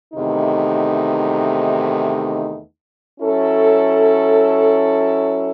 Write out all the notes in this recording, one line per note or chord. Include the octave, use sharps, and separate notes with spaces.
E2 C3 D#3 A3 D#4
F#3 C#4 E4 A4